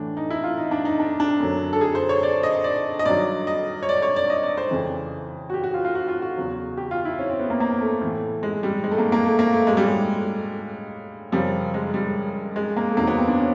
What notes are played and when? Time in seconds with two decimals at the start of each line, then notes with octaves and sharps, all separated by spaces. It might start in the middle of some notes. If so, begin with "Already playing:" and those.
Already playing: A2 E3 D4
0.17 D#4
0.30 E4
0.44 F4
0.57 D#4
0.71 D4
0.85 D#4
1.00 D4
1.20 D4
1.40 F#2 D3 F#3
1.73 A4
1.81 G#4
1.95 C5
2.09 C#5
2.23 D5
2.43 D#5
2.64 D5
2.99 D#5
3.05 G2 D#3 F#3 D5
3.47 D#5
3.83 C#5
3.89 D5
4.02 C#5
4.16 D5
4.30 D#5
4.43 D5
4.57 C5
4.71 F2 C#3 E3
5.50 F#4
5.54 G4
5.64 F#4
5.74 F4
5.85 F4
5.95 F#4
6.08 F4
6.22 F#4
6.37 E2 C#3 F#3
6.77 G4
6.91 F4
7.05 E4
7.18 C#4
7.29 C4
7.39 B3
7.50 A#3
7.60 A#3
7.81 A3
8.01 A2 E3
8.43 G#3
8.63 G3
8.84 G#3
8.91 A3
8.98 A#3
9.12 A#3
9.26 A3
9.39 A#3
9.53 A3
9.67 A2 F#3 G#3
9.77 G3
9.86 G#3
11.32 F#2 C#3 F3 G3
11.74 G#3
11.94 G3
12.56 G#3
12.77 A#3
12.91 A3
12.97 E2 C3 D#3 F#3 A#3
13.07 B3
13.18 C4
13.28 D4
13.39 C#4